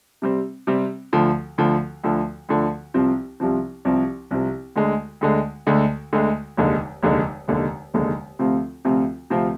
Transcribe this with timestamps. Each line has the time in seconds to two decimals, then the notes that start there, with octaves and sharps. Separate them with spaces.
0.22 C3 G3 C4
0.67 C3 G3 C4
1.13 D2 D3 F3
1.58 D2 D3 F3
2.03 D2 D3 F3
2.49 D2 D3 F3
2.94 C2 C3 F3 C4
3.40 C2 C3 F3 C4
3.85 C2 C3 F3 C4
4.31 C2 C3 F3 C4
4.76 D2 D3 G#3
5.21 D2 D3 G#3
5.66 D2 D3 G#3
6.13 D2 D3 G#3
6.57 F1 D#2 D3 G#3
7.03 F1 D#2 D3 G#3
7.48 F1 D#2 D3 G#3
7.94 F1 D#2 D3 G#3
8.39 D2 C3 F3 C4 F4
8.85 D2 C3 F3 C4 F4
9.30 D2 C3 F3 C4 F4